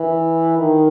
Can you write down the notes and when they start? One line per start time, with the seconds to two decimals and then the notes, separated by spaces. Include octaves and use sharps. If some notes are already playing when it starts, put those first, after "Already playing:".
Already playing: E3
0.58 D#3